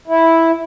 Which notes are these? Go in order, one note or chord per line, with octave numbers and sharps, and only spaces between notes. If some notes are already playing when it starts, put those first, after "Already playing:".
E4